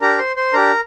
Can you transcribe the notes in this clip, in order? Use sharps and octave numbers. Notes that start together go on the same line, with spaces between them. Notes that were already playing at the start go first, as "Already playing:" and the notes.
D4 G4 A#4 A#5
C5 C6
C5 C6
D4 G4 A#4 A#5